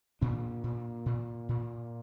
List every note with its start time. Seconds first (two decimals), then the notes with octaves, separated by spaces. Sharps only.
0.21 A#2 D4
0.64 A#2
1.06 A#2
1.49 A#2